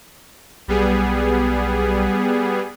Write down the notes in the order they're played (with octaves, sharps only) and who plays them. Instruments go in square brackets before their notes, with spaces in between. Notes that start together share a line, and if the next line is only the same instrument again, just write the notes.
[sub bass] B1 [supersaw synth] G3 B3 G#4